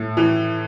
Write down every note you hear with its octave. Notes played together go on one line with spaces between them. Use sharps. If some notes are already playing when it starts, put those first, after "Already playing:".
Already playing: A2
E3